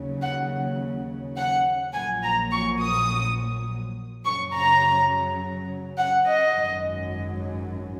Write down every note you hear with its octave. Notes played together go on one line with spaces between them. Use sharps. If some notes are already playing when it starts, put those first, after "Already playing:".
Already playing: D#2 C#3 F#3
F#5
F#5
A#1 A#2 F#3 G#5
A#5
C#6
D#6
F#2 C#3 F#3 C#6
A#5
F#5
D#5
G#1 F#2 F#3